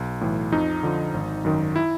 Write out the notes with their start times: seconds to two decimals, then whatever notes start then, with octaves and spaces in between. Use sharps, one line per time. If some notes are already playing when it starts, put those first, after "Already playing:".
Already playing: B1
0.21 A2 E3
0.52 F2 D#4
0.83 D3 F3
1.14 G#1
1.45 F#2 D#3
1.76 E4